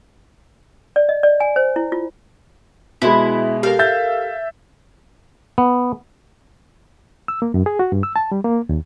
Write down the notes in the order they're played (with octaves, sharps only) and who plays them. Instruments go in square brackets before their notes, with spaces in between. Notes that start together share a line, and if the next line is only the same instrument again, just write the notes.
[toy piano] D5
D#5
D5
G#5
C5
E4
F4
[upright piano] B2 G#3 [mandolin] E4
[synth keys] G4 A4 A#4 [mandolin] F5
[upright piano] E5 G6 A6
[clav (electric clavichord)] B3
[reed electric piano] E6
A#3
F#2
G#4
F#4
G2
E6
A5
G3
A#3
D#2